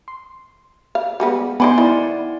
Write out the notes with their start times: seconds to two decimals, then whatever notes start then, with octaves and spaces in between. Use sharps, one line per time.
0.08 C6
0.95 F5
1.20 G3 G#3 B3
1.60 B3 D#4 D5 F#5 G#5 B5 C6
1.78 D#3 E4 D5